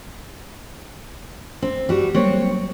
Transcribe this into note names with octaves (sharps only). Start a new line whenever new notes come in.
C4
G3 F#4
F#3 G3 A#3 C4 C#5